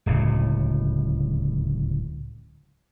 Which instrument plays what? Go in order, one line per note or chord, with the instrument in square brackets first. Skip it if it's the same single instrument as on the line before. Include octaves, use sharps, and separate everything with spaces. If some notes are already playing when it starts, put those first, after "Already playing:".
[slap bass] D1 C#2 A2